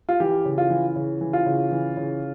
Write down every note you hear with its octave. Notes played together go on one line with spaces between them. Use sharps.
F4
E3 G4
C#3
F4
E3
C#3
E3
F4
C#3
E3
C#3